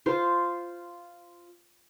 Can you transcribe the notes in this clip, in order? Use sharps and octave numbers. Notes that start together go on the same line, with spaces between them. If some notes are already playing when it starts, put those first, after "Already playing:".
F4 C5